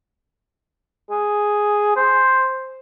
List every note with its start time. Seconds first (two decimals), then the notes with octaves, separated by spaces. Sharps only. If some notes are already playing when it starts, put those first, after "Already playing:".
1.11 G#4
1.96 C5